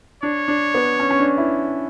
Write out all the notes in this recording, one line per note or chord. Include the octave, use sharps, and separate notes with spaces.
D4 C#5
D4
B3
C#4
C#4
D4
E4